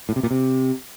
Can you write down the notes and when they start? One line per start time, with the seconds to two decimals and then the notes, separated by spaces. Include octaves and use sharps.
0.09 A2
0.16 C3
0.23 A#2
0.31 C3